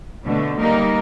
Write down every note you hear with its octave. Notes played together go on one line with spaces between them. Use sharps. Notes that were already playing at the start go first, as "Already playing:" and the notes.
B2 D3 A3
G3 A#3 D#4 A#4